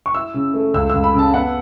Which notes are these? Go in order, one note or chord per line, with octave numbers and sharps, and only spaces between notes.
C#6
E4 E6
C#3
A3
C#2 E6
C#2 E6
B5
C#3
A5
B3 F#5